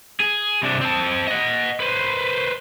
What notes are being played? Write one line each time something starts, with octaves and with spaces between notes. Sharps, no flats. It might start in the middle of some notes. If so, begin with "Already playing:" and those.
G#4
C3 D4
C4 A5
D#5 F#5
B4 C5